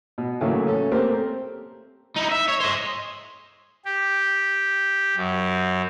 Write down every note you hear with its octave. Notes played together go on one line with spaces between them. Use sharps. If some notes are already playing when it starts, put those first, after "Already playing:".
B2
A2 C#3 E3 F#3 A3 A#3
C#4 A4
A3 A#3 C4 G4 A#4 C5
D#4 E4
E5
C#5
C5 D#5
G4
F#2